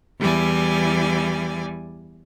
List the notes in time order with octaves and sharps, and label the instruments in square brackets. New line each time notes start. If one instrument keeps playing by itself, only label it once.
[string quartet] E2 E3 G3 D5 G#5